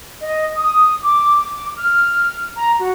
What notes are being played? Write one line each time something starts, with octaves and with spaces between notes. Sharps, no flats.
D#5
D#6
D6
F6
A#5
F#4